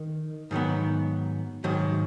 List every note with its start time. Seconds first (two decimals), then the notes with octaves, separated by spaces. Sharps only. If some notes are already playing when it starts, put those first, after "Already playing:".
Already playing: D#3
0.51 G#2 D#3 F#3 B3
1.64 G#2 D#3 F#3